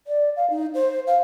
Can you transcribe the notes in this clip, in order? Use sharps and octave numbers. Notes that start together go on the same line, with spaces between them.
D5
F5
D#4
C5
F5